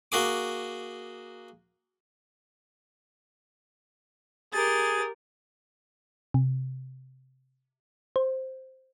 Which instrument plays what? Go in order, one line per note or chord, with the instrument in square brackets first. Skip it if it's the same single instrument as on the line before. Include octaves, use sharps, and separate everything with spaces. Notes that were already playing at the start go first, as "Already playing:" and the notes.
[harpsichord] A#3 F#4 G#4 D6
[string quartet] G4 A#4 A6 [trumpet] G#4
[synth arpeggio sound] C3
C5